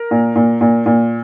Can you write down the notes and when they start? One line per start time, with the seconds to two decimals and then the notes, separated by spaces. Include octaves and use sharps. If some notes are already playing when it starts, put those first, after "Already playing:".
Already playing: A#4
0.11 A#2
0.35 A#2
0.61 A#2
0.86 A#2